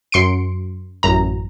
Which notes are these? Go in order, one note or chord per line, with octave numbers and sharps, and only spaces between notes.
F#2 C6 C#7 D7
A1 F#2 A#5